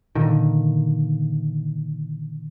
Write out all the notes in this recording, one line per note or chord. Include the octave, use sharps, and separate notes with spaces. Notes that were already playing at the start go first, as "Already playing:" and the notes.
A#2 D3 D#3